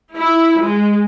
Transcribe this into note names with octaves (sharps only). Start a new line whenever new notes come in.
E4
G#3